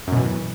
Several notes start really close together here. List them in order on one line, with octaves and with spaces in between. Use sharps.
F#2 B2 E3